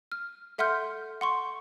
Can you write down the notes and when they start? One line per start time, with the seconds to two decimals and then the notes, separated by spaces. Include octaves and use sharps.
0.12 F6
0.58 A4 E5 F#5 C6 F6 G6
1.21 F#5 C6 C#6